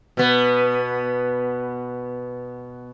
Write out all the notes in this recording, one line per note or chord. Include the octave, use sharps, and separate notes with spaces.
B2 B3